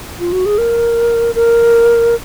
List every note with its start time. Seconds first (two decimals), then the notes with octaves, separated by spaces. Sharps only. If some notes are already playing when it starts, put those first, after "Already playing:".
0.20 F4
0.32 F#4
0.46 G#4
0.58 A#4
1.35 A#4